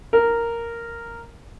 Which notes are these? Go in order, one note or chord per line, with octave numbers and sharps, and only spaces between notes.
A#4